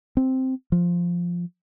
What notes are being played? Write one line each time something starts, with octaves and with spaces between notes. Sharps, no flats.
C4
F3